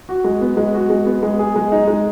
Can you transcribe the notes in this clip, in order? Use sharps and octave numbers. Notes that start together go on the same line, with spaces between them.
F#4
G#3
B3
G#3
F#4
G#3
B3
G#3
G#4
G#3
D#4
G#3